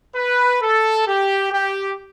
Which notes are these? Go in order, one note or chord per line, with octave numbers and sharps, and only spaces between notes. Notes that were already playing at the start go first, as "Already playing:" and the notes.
B4
A4
G4
G4